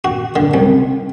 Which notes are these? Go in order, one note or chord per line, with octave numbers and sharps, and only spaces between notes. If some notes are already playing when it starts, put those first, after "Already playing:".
F#4
D3
C2